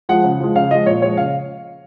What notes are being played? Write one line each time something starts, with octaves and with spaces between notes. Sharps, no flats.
F3 G#3 F#5
C#3
F3 G#3
C#3 F5
F3 G#3 D#5
A#2 C#5
F3 G#3 C#5
C#3 F5